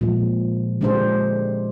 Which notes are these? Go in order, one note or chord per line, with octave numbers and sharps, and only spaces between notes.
A#2 F3 G#3
D3 G#3 D4 G4 C5